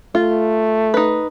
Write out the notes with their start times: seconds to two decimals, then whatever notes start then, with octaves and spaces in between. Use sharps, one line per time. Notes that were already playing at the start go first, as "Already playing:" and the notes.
0.15 A3 F4
0.94 D#4 B4